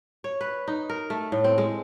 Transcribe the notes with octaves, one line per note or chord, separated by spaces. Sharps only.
C#5
B4
D#4
A#4
A3
A2
C4
G#3